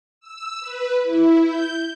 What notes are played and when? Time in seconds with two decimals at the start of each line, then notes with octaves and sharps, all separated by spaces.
0.20 E6
0.60 B4
1.02 E4
1.44 G6